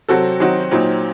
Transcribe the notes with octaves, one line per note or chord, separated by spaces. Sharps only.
C3 F#3 C4 F#4 A4
D#3 F#3 C4 D#4 F#4
A#2 F#3 C4 D#4